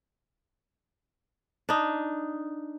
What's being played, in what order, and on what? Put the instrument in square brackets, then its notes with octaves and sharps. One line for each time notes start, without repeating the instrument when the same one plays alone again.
[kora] D4 D#4